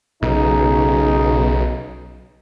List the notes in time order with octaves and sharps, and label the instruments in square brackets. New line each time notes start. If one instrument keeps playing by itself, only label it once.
[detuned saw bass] B1 [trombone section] C#3 D#4